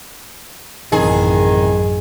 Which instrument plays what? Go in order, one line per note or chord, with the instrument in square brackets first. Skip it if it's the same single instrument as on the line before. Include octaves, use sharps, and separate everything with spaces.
[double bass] A1 F#2 [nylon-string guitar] C3 E3 F#3 [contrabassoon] D#3 [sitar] G#4